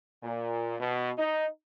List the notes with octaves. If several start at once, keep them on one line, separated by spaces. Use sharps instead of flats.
A#2
B2
D#4